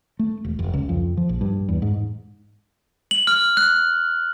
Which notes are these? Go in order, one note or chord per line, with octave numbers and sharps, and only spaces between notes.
A3
E1
F1
C#2
F2
F3
A#1
G2
E2
G#2
F#7
F6
F#6